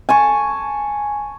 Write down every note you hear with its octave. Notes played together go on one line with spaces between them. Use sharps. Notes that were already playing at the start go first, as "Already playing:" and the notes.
G#5 A5 C#6